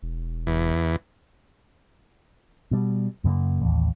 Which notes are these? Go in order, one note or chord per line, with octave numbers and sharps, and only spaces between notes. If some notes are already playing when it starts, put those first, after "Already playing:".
E1
E2
B2 G3
F#2 C#3 A3 A#3
A1 D#2